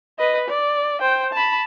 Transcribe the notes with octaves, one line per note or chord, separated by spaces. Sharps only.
B4 D#5
D5
C5 G5
A5 B5